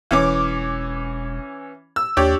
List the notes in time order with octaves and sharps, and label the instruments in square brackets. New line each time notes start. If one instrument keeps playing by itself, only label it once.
[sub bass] E1 [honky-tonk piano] E3 C#4 D6
[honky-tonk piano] E6
[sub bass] D#2 [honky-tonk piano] D4 G4 C#5